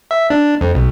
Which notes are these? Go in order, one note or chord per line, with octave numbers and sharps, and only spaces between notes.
E5
D4
F2
B1